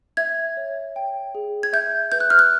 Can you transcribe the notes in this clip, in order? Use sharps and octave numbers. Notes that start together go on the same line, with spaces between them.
E5 G#6
C#5
G5
G#4
G#6
E5 G6
B4 G6
F#6
F6
F#6